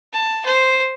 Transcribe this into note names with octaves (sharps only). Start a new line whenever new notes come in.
A5
C5